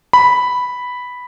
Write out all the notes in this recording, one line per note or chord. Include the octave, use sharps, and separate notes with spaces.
B5